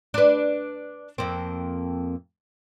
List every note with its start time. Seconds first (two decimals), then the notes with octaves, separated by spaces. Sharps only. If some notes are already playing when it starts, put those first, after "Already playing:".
0.14 D4 B4
1.18 F2 A#3 C4